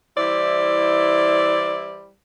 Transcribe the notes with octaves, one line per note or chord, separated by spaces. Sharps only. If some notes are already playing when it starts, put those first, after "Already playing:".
E3 G3 E4 C5 D5